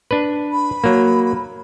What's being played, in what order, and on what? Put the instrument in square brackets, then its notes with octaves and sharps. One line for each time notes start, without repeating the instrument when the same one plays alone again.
[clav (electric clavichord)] D4 B4
[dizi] B5
[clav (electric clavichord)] F#3 A#3